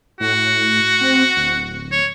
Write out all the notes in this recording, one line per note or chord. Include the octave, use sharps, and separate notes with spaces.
A2 F#4
C4
D1
C#5